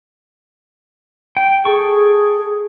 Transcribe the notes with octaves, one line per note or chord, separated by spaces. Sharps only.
G5
G#4 A4 C#6